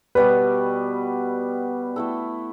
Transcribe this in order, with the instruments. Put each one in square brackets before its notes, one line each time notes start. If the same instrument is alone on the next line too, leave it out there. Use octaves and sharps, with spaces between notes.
[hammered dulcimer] B2 G3 B3 F#4 [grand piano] B4
[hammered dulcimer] A3 E4 A4